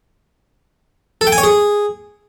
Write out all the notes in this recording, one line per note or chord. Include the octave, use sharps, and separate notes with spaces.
A4
G5
G#5
C#5
G#4